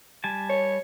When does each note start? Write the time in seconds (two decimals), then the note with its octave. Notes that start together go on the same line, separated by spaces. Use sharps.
0.24 G3 G#5 A5
0.49 C#5